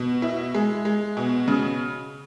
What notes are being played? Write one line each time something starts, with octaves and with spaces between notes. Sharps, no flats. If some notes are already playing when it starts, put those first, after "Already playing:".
Already playing: B2
E4
G#3
G#3
B2
C#3